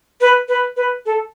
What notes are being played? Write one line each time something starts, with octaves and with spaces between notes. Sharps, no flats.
B4
B4
B4
A4